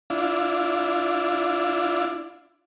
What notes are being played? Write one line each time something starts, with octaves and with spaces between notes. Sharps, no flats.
D4 E4 F4